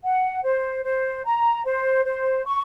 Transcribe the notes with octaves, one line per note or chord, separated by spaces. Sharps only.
F#5
C5
C5
A#5
C5
C5
C#6